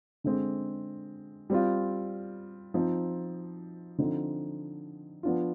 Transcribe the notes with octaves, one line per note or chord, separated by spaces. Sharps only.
D3 G#3 C4
G3 C4 F4
F3 C4 D#4
D3 F3 C4 D#4
F3 B3 D4 F4